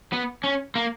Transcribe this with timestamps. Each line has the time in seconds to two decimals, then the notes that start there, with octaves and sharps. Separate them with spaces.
0.13 B3
0.44 C#4
0.75 A#3